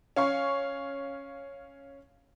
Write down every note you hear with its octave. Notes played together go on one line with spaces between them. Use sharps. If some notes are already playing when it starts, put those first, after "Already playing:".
C#4 F5 C#6